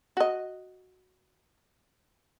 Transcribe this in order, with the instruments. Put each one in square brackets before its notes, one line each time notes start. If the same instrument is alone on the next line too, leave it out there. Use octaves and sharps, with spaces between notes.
[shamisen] F#4 D#5